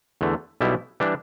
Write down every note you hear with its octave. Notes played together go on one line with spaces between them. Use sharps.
E2 D3 A3
B1 B2 G3 E4
E3 G3 D4